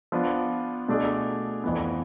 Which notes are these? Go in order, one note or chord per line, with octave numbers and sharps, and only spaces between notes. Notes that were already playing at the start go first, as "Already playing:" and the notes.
F3 B3 D4
B2 A3 D4 G#4
F2 E3 B3